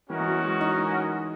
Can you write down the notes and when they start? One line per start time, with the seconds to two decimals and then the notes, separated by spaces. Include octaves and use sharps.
0.09 E3 C#4 F#4 A#4 D#5
0.21 E3
0.26 F#3
0.43 G#3
0.61 D#4